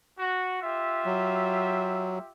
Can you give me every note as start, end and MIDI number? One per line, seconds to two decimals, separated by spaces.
0.19 0.59 66
0.62 2.31 65
0.62 2.31 67
0.62 2.31 76
1.05 2.19 54